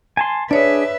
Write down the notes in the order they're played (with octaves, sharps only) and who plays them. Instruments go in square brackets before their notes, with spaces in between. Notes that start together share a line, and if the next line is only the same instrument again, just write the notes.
[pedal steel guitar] G#5 A5 C6
[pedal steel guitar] D4 G#4 [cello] B4 E5 [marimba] C#5 D5